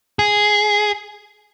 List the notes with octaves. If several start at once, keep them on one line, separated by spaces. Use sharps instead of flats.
G#4